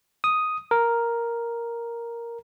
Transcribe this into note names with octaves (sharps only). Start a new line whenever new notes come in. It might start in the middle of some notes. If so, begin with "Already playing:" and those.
D#6
A#4